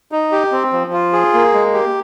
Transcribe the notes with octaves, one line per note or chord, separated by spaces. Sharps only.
D#4
G4
C4
F3
F4
G#4
A#3
G#3
G4